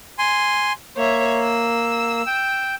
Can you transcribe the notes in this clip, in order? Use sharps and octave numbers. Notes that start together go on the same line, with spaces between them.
G#5 C6
A#3 C#5 E5
E6
G5